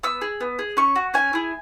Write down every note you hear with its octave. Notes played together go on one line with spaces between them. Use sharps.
B3 E6
G#4
B3
G#4
C#4 C#6
F#4
C#4 G#5
E4 G#4